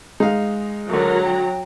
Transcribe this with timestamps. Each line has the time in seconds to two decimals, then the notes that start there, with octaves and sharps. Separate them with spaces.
0.20 G#3 D#4 F5
0.89 C#2 D3 F#3 A#4 A#5
1.24 G5